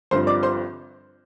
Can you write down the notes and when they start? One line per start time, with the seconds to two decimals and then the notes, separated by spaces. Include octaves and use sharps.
0.11 G1 G2 F3 C4 C5 C6
0.27 D5 D6
0.43 C5 C6